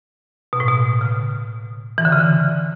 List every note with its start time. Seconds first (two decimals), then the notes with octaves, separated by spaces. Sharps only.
0.53 B2
0.60 A2
0.68 B2
1.01 C#3
1.98 E3
2.05 D3
2.12 C#3
2.20 D3